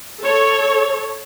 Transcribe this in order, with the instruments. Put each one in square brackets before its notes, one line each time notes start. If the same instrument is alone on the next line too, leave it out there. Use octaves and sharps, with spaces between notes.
[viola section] A4 C#5